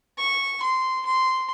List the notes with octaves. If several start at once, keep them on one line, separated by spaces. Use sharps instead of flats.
C#6
C6
C6